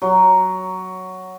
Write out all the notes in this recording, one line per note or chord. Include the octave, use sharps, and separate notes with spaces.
F#3